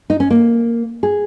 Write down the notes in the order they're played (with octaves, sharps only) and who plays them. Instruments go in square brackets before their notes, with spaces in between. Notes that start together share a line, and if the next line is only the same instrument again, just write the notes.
[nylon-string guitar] D#4
C#4
A#3
G#4